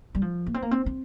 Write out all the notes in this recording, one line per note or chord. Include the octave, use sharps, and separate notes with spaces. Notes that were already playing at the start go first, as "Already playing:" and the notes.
G3
F3
A#3
C4
A#3
C4
C4